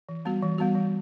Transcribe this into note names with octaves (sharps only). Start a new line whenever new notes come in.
E3
G3 B3 F#4
E3
G3 B3 F#4
E3